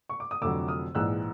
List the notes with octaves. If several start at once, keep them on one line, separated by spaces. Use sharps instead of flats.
C#6
D6
D#6
F1 F2 D3 F#3 D6 E6
D#6 F6
A#1 G#2 E3 E6 F#6